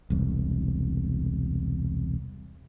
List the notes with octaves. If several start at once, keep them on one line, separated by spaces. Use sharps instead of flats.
E1 C2